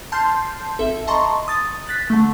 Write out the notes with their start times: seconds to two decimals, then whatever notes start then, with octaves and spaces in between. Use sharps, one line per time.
0.12 A5 C6 F6 G6 C7
0.79 G#1 A4 E5
1.07 D#5 A5 A#5 C6 C#6
1.48 D#6 A6
1.87 F#6 A6 B6
2.10 D3 A3